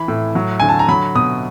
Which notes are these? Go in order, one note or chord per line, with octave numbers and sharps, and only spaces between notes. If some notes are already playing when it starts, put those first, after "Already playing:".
Already playing: E3 B5
A2
F#3
D3 G#5
A5
A#5
F#3 B5
B2 D#6